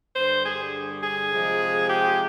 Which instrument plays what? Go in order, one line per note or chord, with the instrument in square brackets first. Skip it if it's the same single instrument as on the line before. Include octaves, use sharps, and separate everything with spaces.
[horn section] G2 D3 G3 C5
G#4
G#4
C3 F3 G#3
G4